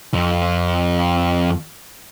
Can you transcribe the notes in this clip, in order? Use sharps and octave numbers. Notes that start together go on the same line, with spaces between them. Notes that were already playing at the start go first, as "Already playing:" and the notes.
F2 F3